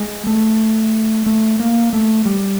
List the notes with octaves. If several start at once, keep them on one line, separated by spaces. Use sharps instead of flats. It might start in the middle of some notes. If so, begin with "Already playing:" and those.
Already playing: G#3
A3
A3
A#3
A3
G3